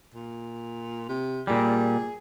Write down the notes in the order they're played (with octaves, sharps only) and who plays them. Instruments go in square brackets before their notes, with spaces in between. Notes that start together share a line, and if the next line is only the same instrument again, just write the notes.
[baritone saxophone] A#2
C3
[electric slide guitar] A#2 G3 [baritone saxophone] G#4